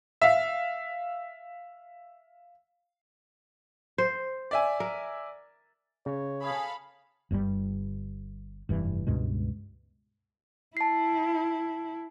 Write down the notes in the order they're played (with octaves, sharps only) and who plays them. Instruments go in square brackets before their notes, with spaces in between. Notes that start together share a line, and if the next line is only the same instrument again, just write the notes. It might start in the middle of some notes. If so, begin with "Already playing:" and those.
[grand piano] E5 F5
[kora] C5
[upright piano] D5 E5 G#5
[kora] A#4
[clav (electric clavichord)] C#3 [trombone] C#5
[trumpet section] G#4 [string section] A4 F5 B5
[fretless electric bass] G1 G2 C#3 G3
F1 G2 E3
C#2 G2 B2 G#3
[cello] E4 [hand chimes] A5 C7